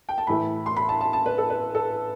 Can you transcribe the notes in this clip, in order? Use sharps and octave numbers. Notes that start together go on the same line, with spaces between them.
G5
A5
A2 E3 A3 B5
C6
B5
A5
A5
A5
B4
A4
B4
A4